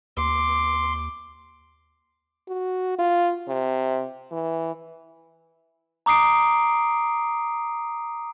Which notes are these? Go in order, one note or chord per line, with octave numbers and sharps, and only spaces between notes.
D#2 C6 D6
F#4
F4
C3
E3
A#5 D6 D#6 C7 D7